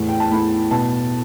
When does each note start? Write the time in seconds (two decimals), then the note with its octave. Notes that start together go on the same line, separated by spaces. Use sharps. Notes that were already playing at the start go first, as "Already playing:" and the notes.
Already playing: E2 A2
0.09 G5
0.20 A5
0.31 A2 B5
0.71 B2 A5